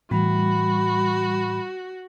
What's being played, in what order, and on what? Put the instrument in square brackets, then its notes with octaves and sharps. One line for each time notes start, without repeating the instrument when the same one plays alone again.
[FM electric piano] A2 E3 [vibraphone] G3 [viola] F#4 [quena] B5